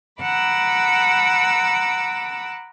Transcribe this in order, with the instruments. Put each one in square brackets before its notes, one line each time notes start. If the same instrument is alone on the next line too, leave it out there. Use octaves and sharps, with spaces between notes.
[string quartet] F#5 A#5 B5 D6 E6